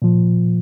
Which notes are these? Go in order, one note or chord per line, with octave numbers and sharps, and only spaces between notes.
A#2 F3